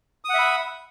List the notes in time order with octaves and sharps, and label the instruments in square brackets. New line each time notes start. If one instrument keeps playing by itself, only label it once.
[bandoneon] D#6
F#5
E5
B5